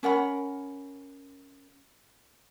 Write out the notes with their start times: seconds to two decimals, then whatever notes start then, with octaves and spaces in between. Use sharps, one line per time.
0.03 C#4 A#4 F#5 B5